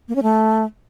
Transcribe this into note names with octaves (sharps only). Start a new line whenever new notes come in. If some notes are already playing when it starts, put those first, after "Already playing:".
A#3
C#4
A3